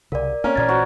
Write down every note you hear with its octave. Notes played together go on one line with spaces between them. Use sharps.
C2 C#3 A#4 D5
A#3 C4 C#4 A#4
A1 A#2 E3 D5 G#6 A6
F#4 A#4 C5